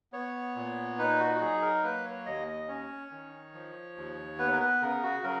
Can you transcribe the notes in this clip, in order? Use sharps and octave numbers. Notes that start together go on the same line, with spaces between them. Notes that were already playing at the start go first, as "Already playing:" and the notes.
B3 C#5
A#2
D#4 B4
F#4
F#4
F#3 G#4
A#4
A#3 B4
C#5
D#2 D#5
D#5
C#4 C#5
D#3
F3
D#2
B3 B4
A#4
B4
C#3 A#4
F#4
F#3 A#4